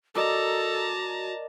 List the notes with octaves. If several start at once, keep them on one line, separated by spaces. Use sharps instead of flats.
F#4 A4 A#4 D5 D#5 A5 A#5